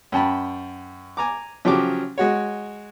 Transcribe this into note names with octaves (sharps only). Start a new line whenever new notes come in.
F#2 G5 A5 B5
G#5 A#5 D6
C#3 F3 F#3 G4 D6
G#3 F#4 C#5